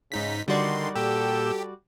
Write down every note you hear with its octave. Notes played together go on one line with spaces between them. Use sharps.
G#2 C#3 D#4 B6
D3 D#3 G3 F#4 D5 C6
A#2 G4 A4 G5 E6